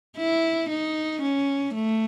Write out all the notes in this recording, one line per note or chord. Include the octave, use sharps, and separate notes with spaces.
E4
D#4
C#4
A3